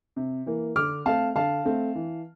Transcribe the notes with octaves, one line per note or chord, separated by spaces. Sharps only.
C3
E3 A#3
D3 D6 F6
A3 C4 F5 A5
D3 F5 A5
A3 C4
E3